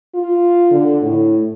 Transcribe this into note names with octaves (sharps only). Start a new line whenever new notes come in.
F4
D3
A2